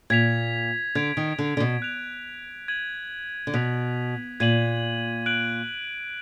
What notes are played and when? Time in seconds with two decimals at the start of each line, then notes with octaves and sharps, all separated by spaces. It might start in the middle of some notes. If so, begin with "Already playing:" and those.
0.10 A#2 G#6 B6 F7
0.95 D3 G#6 D7 F7
1.17 D#3
1.39 D3
1.57 D3
1.60 B2
1.82 F#6 D7 F7
2.68 G#6 D#7 F#7
3.47 D3
3.54 B2 F#6 B6 F7
4.40 A#2 G#6 D#7 F#7
5.26 F#6 D7 F#7